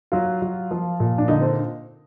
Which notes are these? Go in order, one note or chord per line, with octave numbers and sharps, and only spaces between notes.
F#3 F4
F#3
F3
A#2
D4
D3 D#4
C4